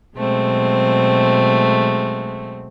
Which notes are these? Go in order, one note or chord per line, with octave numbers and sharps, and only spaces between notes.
B2 F#3 G#3 A3 C4